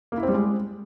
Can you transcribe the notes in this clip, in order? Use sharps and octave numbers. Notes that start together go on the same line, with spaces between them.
A#3
E4
C4
G3
G#3